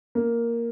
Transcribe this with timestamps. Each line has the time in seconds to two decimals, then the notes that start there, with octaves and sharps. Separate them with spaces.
0.15 A#3